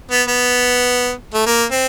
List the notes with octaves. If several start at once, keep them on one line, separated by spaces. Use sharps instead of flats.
B3
B3
A3
A#3
C4